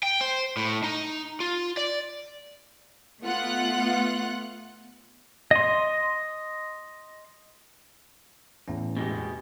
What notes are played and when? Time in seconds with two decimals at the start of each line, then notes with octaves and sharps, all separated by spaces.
0.03 G5
0.21 C5
0.57 A2
0.84 D#4
1.40 F4
1.77 D5
3.22 A3 B3 F4 F#5 F#6
5.51 D#5 C6
8.68 E2 A2 C#4
8.97 B2 G#3 G4